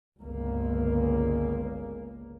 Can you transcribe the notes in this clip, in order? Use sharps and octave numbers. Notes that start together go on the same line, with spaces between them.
G1 C#2 A#3